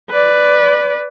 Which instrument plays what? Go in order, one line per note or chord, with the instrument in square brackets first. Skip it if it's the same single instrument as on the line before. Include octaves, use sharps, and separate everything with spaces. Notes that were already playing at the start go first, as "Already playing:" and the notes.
[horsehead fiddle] B4 D5